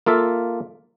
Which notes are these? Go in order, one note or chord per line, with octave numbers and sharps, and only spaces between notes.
A#3 F4 A4 E5